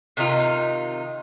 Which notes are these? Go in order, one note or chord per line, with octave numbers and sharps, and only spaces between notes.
C3 D#3 D#4 F4